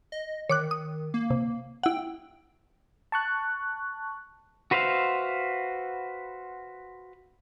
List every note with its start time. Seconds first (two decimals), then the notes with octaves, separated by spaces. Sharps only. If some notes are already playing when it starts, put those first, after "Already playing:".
0.12 D#5
0.49 D#3 C#5 D6 F#6
0.71 D#6
1.14 A#3
1.30 C3
1.83 E4 F#5 G5
3.12 A5 C#6 F#6
4.71 F#4 B4 C5 E5 F5